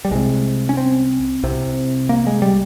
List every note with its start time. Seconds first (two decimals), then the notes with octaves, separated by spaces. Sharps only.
0.05 G3
0.11 C2 C3 G#3
0.69 C#4
0.77 C4
1.43 C2 C3
2.09 A#3
2.27 G#3
2.42 G3